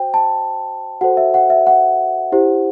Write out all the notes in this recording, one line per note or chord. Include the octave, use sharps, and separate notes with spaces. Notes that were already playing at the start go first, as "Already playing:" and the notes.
Already playing: F#4 C5 G5
A5
F#4 A4 C5 F#5
E5
F#5
E5
F#5
E4 G4 C5